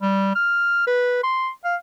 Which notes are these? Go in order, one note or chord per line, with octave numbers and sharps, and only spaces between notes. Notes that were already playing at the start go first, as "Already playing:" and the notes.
G3
F6
B4
C6
F5